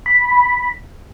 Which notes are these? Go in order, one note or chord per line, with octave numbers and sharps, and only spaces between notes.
B5